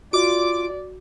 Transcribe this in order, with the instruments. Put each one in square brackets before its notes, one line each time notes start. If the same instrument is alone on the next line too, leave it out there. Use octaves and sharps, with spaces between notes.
[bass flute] F4 [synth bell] F#4 [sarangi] D5 [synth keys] D6 D7